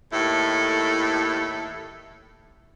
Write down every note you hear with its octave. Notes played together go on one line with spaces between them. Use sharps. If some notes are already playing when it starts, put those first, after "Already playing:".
D#2 A2 E4 A4